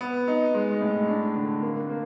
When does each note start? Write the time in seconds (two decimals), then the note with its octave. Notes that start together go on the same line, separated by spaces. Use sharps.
0.01 B3
0.28 D#4
0.54 G#3
0.81 A2
1.08 D4
1.35 D3
1.62 A#3
1.90 A#3